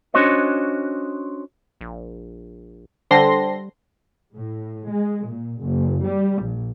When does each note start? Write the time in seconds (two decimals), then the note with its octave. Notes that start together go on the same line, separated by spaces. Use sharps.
0.14 C#4 D4 F#4 C5 C#5 D#5
1.81 A#1
3.11 D3 G3 C5 G5 A5 C6 A#6
4.34 A2
4.89 G#3
5.25 A#2
5.61 F#1
6.06 G3
6.41 A#1